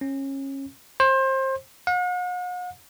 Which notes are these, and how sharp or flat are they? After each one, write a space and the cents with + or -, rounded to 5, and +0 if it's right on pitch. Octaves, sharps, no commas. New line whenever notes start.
C#4 -25
C5 +25
F#5 -45